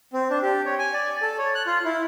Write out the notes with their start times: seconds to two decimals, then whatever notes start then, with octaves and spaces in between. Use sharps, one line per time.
0.13 C4
0.30 D4
0.43 G4
0.66 C#5
0.79 G#5
0.94 D5
1.22 A4
1.39 C#5
1.55 F#6
1.67 F4
1.85 E4